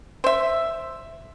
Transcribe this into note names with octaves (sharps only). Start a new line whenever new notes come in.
C5 E5